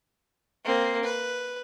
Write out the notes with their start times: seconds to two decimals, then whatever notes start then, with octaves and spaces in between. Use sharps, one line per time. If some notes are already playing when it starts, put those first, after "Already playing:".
0.64 A#3 C4
1.03 B4